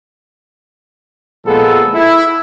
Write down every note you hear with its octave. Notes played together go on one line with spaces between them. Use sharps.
A#2 F3 G#3 B3 G#4 A4
E4